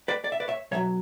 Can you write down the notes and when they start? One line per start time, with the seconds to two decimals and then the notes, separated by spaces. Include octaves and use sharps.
0.08 B4 D5
0.24 D5
0.32 E5
0.40 B4 D5
0.48 C#5 E5
0.71 B1 B2 F#3 C#5 E5